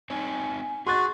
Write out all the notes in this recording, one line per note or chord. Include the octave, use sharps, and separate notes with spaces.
C4 D#4 C#5 G#5
F#4 G#4 C6 F#6 A6